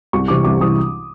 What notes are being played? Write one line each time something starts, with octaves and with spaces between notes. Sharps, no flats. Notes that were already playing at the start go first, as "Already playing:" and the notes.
C2 C#6
C3 E3 G3 D6
C2 D6
C3 E3 G3 D#6